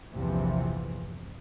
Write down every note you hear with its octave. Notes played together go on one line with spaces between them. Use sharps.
A#1 E2 G2 C3 E3 F3